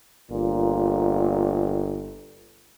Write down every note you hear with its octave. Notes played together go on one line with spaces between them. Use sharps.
G1 A#2